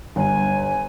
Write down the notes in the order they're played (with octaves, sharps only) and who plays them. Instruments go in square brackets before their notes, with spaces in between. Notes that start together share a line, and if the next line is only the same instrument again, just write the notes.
[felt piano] G1 [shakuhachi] G#5